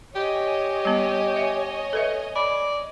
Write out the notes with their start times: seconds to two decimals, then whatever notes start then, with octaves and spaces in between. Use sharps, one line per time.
0.15 G4 C#5 D#5 G#5
0.85 G3 B3
1.36 E5
1.93 A4 B4 E5
2.36 D5 B5